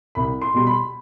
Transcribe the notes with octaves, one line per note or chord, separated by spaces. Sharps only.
C2 B5
C6
B2 G3 C6
B5